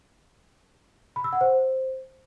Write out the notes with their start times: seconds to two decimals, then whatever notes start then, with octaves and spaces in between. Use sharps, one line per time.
1.16 B5
1.24 E6
1.33 F#5
1.41 C5